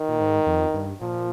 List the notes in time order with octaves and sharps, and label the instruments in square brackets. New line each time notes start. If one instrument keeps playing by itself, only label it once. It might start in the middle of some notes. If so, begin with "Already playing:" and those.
Already playing: [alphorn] D#3
[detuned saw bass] A#2
G#2
F2
G2
[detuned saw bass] A#2 [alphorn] F3